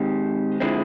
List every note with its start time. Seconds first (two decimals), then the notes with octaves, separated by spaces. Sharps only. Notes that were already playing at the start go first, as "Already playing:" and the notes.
Already playing: D#3 G#3 C4 D#4 G4
0.60 D3 F3 G#3 C4 E4